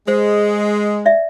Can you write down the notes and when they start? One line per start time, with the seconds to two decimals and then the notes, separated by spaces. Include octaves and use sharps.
0.08 G#3 C5
1.06 D5 E5